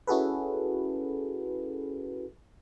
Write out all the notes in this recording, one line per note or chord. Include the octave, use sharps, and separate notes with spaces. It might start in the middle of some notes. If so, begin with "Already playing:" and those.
C#4 E4 F#4 G#4 A4 B4